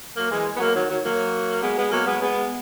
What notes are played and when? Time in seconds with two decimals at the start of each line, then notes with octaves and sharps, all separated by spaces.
0.17 F#3 A#3
0.31 E3 G#3
0.55 B3
0.60 F#3 A#3
0.75 D#3 F#3
0.90 D#3 F#3
1.04 F#3 A#3
1.62 G#3 B3
1.78 G#3 B3
1.92 F#3 A#3
2.06 G#3 B3
2.22 G#3 B3